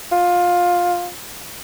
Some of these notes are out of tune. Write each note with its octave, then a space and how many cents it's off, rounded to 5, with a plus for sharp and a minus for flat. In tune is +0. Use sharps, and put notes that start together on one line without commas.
F4 +15